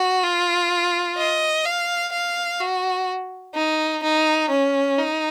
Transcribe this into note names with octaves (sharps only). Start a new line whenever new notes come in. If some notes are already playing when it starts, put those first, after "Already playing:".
Already playing: F#4
F4
D#5
F5
F5
F#4
D#4
D#4
C#4
D#4